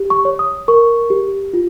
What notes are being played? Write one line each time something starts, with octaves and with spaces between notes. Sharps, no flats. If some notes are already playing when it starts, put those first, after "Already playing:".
Already playing: G4
C#6
C#5
D#6
A#4 C#6
G4
F4